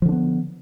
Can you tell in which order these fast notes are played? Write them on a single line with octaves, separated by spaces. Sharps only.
F3 D3 D4 B3